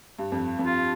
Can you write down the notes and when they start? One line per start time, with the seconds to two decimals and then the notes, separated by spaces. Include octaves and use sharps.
0.19 G2
0.32 F2
0.59 F2
0.65 F4